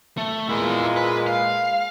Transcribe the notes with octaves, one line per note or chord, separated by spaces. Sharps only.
A3
A#2 G#3 B3 E4
B4
F5